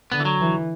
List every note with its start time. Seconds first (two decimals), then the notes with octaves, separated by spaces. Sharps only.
0.12 D3 B3
0.20 E3
0.25 F#3
0.40 E3